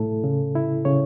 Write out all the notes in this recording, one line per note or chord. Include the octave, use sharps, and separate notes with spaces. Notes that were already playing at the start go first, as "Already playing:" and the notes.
Already playing: A2 A3 E4 A4
C#3
E4
C#3 C#5